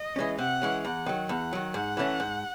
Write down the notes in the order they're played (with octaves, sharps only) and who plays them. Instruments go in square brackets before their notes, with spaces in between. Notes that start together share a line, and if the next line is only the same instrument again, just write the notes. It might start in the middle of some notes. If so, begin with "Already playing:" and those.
Already playing: [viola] D#5
[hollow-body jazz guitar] E3 G#3 C#4
[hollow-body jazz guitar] C3 [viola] F#5
[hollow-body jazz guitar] E3 G#3 C#4
[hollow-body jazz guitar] E2 [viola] F#5
[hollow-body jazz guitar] D#3 F#3
[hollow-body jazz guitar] E2 [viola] F#5
[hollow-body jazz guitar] D#3 F#3
[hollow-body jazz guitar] G#2 [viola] F#5
[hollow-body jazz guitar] E3 A3 C#4
G#2